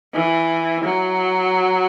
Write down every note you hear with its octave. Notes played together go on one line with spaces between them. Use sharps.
E3
F#3